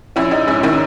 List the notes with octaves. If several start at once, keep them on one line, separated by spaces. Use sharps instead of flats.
A#1 C#4 E4
A#1 D#4
G#2 C#4 E4
D#3 C#4 E4